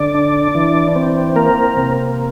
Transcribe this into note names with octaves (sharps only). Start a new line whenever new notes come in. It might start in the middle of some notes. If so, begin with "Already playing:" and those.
Already playing: D3 D5
D4
E3
C4
A#3 A#4
C3